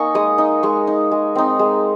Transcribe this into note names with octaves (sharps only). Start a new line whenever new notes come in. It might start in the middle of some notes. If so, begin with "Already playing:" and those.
Already playing: A#3 D#4 G#5 A#5 C#6
G#3 D#6
D#4
G#3 C#6
D#4
G#3
C4 D#4
G#3